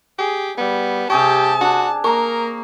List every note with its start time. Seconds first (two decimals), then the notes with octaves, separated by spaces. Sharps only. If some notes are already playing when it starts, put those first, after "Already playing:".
0.18 G4 G#4
0.58 G3 B3
1.10 C3 G4 G#4 C#5 A5
1.61 D4 F#4
2.04 A#3 A#4 A#5 C#6